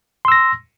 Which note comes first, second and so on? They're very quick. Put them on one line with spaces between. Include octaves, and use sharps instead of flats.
C6 E6 A#6